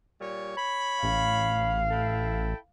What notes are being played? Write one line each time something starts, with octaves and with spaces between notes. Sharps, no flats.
A#2 G3 C#5
C#5 B5
A1 F5
E4 A4 G5